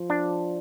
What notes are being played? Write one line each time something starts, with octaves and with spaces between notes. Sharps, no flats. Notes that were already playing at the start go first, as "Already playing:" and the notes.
Already playing: F3
D4